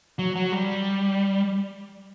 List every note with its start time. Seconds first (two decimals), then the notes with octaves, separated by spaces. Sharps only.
0.19 F#3
0.35 F#3
0.52 G3